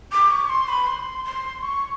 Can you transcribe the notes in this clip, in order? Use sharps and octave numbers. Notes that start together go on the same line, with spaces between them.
D6
C#6
C6
B5
C6
C6
C#6